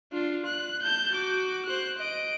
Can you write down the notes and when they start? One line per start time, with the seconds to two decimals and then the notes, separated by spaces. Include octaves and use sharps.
0.12 D4 F4
0.45 F#6
0.82 A5 G6
1.12 F#4 D6
1.66 C5 F#6
1.98 D#5 D7